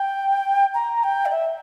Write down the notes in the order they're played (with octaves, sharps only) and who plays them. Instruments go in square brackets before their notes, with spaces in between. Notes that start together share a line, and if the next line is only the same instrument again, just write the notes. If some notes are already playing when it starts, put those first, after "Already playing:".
Already playing: [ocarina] G5
A#5
G5
D5
E5